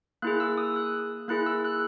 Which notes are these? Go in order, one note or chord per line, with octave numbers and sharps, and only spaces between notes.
A#3 E4 G#4 F#6
E6
D#6
F#6
A#3 E4 G#4 F#6
E6
F#6